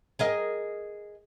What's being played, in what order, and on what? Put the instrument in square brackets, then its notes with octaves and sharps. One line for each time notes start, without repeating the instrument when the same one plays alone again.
[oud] G#4 A#4 D#5